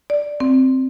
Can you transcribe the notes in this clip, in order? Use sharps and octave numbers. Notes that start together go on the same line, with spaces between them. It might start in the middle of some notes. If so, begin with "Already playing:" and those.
D5
C4